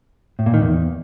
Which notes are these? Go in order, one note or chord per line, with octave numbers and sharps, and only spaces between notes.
A2
A#2
D#3
E2